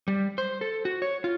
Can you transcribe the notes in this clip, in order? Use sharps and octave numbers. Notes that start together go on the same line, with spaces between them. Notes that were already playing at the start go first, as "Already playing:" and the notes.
G3
C5
A4
F#4
C#5
F4